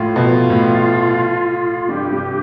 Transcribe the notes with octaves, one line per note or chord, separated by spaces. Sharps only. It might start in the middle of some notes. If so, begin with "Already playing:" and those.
Already playing: A2 F4
B2
A2
G2 G4
G2